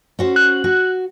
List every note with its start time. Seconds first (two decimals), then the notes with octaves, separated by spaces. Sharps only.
0.19 C#4 F#4 C5
0.36 F#6
0.64 F#4